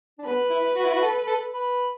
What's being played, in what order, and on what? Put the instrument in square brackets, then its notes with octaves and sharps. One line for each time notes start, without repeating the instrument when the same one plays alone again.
[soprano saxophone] D4
[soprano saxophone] B3 [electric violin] B4
[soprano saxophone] E4
F#4
E4
F#4
A4
A4
B4